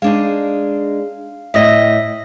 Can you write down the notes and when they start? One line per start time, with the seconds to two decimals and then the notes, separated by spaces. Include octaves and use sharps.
0.02 G#3 D4 D#4 F5
1.54 A2 D#5 E5 D#6 A#6